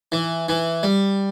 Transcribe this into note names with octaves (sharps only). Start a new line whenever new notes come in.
E3
E3
G3